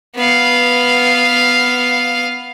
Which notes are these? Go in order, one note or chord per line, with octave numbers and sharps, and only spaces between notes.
B3 F5